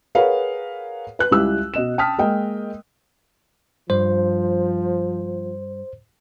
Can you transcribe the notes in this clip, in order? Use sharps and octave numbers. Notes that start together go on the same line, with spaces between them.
G#4 A#4 B4 C#5 F5 F#5
B4 F#6
C#2 G3 E4 G4 E6
B2 D#5 E7
G5 A5 D#6 F6 B6
G#3 A#3 A#4 D#5 G5
G2 F3 C5